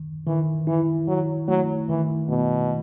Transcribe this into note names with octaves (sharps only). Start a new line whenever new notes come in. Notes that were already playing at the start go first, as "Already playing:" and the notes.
Already playing: D#3
D#3 E3
E3 E4
D#3 F#3
F#3 A3
D#3 E3
B2 A3